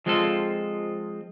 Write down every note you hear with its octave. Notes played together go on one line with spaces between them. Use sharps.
F3 G#3 C4 F4 A4